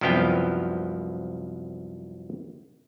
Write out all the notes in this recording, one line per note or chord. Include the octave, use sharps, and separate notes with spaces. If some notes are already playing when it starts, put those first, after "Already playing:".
C2 F#2 F3 B3 F5 G5